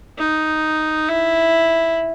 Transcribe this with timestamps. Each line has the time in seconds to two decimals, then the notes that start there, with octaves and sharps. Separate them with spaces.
0.18 D#4
1.08 E4